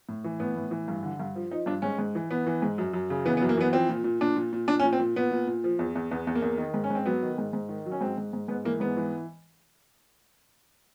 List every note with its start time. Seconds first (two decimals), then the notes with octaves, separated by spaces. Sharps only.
0.09 A2
0.24 E3
0.40 A2 B3
0.56 A2
0.71 E3
0.88 G2
1.03 D3
1.20 G2
1.35 F3
1.51 F3 D#4
1.66 G2 D4
1.82 G#2 C#4
1.98 G#2
2.15 E3
2.31 E3 B3
2.47 E3
2.62 G#2
2.78 F#2
2.94 F#2
3.10 C#3
3.25 E3 B3
3.37 B3
3.42 F#2
3.49 A#3
3.57 E3 B3
3.72 F3 C4
3.89 A#2
4.04 A#2
4.21 A#2 D4
4.36 A#2
4.53 A#2
4.68 A#2 D4
4.80 C#4
4.84 A#2
4.93 C4
4.99 A#2
5.16 A#2 B3
5.31 A#2
5.47 A#2
5.64 F3
5.79 E2
5.95 E2
6.11 E2 B3
6.27 E2
6.35 A#3
6.42 E2
6.58 D#3
6.74 G#2
6.84 C#4
6.90 G#2 C4
7.06 F#3 B3
7.23 D#3
7.38 G#2
7.53 G#2
7.69 D#3
7.86 F#3
7.92 C#4
8.01 G#2 C4
8.18 G#2
8.33 G#2
8.48 G#2 B3
8.65 E3 A#3
8.80 G#2 B3
8.97 E3